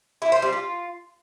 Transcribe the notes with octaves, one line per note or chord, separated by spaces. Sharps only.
E4
C5
G3
F4